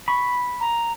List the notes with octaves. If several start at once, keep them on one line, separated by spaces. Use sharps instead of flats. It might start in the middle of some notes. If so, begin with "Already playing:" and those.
B5 C#6
A#5